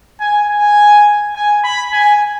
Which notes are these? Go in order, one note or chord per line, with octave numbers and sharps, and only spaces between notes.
G#5
G#5
G#5
B5
G#5